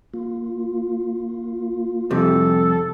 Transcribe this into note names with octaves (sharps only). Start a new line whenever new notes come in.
A#3 F4
F2 C3 G3 A4